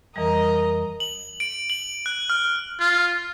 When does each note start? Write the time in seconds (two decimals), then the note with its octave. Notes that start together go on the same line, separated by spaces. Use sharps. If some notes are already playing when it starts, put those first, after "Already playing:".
0.16 F2 E3 G3 A#4 D#5 A#5
1.00 F#7
1.40 D7
1.70 F#7
2.06 F#6
2.30 F6
2.80 F4